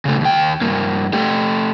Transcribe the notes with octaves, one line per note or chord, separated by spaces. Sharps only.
C#3 A3
D#2 G5
G2 A#3
A3 G4